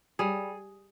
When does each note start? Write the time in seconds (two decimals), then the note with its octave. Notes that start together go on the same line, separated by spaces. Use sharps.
0.19 G3 G#4